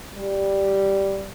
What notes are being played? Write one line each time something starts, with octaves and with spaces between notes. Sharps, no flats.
G3